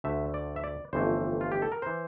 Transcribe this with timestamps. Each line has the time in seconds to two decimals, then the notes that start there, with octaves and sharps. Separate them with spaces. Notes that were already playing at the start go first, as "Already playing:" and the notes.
0.04 D2 D3 A3 E5
0.34 D5
0.56 E5
0.64 D5
0.93 G1 F2 E3 A3 C5
1.41 F4
1.52 G4
1.62 A4
1.72 A#4
1.82 E3 C5